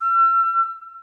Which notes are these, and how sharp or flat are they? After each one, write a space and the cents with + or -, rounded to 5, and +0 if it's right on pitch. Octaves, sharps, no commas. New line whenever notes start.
E6 +40